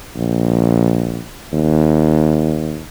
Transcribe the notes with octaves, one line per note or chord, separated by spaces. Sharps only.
A#1
D#2